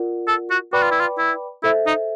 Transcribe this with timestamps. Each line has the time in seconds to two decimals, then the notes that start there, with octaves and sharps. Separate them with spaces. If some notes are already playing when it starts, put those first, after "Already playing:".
Already playing: F4 A#4 D5 F#5
0.28 A4
0.50 F#4
0.73 F#4 B4 D5 G5 B5 D6
0.82 F4
0.91 E4
1.00 F4
1.18 E4
1.63 E4 A4 C5 E5
1.86 D#4